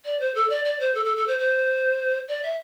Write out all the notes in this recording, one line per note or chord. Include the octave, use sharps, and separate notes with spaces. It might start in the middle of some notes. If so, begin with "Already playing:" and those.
D5
C5
A4
D5
D5
C5
A4
A4
A4
C5
C5
D5
E5